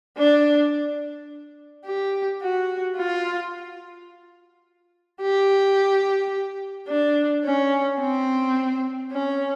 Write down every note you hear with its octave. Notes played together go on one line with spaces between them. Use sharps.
D4
G4
F#4
F4
G4
D4
C#4
C4
C#4